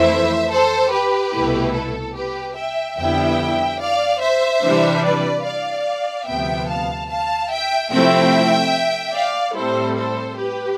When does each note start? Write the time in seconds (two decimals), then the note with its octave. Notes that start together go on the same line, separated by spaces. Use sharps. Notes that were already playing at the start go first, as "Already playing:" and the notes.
Already playing: F2 E3 A3 E4 C5 E5
0.51 A4 C5
0.92 G4 B4
1.33 C2 B2 A3 E4
1.74 A4
2.15 G4 B4
2.56 E5 G5
2.97 F2 D3 G3 B3 E4 E5 G5
3.80 D5 F5
4.21 C5 E5
4.62 C3 E3 G3 D4
5.03 B4 D5
5.44 D5 F5
6.26 D2 C3 F3 B3 E5 G5
6.68 F5 A5
7.09 F5 A5
7.50 E5 G5
7.91 C3 F3 A3 C4 E4 E5 G5
9.15 D5 F5
9.55 A2 G3 C4 E4 A4 C5
9.97 A4 C5
10.38 G4 B4